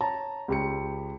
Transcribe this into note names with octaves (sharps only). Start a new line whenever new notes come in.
C#5 A5 A#5
C#2 G4 C#7